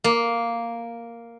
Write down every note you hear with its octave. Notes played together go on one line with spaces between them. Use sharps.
A#3